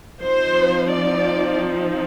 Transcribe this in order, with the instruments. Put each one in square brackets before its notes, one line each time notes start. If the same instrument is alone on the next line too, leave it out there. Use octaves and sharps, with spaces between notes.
[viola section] F3 C4 D#4 C5
D5